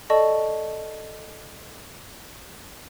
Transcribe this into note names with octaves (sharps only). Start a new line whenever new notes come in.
A4 D5 D#5 A5 C#6